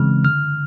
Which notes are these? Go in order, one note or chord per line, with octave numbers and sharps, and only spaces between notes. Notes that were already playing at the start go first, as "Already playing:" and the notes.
Already playing: C#3 E3 G#3 C4 F6
D3 F6